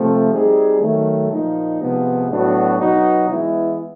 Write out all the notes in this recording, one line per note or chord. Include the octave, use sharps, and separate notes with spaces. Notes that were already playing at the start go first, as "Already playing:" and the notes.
Already playing: C3 F3 A3 C4
G3 C4 D#4 G#4
D#3 F#3 A3
A#2 F3 A#3 D#4
C3 F3 G#3 B3
A2 F#3 B3 D4 F#4
B2 F#3 B3 D#4 F#4
E3 G#3 B3 E4